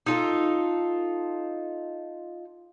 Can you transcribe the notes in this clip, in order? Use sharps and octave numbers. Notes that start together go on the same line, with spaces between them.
D#4 F4 A4